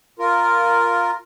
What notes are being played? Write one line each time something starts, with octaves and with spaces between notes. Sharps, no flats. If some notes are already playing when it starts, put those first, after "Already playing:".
F4 A#4